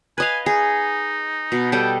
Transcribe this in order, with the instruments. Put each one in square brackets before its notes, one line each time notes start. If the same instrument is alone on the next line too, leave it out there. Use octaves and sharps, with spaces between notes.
[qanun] B4 D#5 F5 [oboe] G#5
[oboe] D#4 [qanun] G#4
[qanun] B2
[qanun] G3 A4 D#5 [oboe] G5